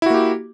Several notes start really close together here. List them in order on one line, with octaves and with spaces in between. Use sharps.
E4 F#4 A#3 G4